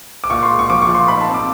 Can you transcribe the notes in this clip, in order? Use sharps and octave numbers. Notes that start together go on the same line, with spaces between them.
D6
A#2 C#6
C6
G#3
C#6
F3 D6
C#6
A#2
C6
D#4 B5
A5
C4
D6